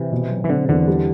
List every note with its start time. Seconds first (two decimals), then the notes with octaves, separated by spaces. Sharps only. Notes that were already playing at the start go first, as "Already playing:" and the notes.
Already playing: C3 E3
0.12 B2
0.30 F#3
0.44 E3
0.49 D3 C4
0.69 E2 D3
0.87 G3